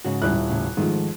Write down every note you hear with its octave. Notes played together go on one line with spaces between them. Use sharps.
G#2 C#3 F#4
D#1 E4 F#6
A2 C#3
G#2 D#3 F3 A3